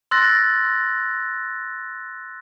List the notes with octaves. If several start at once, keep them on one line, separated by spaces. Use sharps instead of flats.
C6 E6 F#6 A6 A#6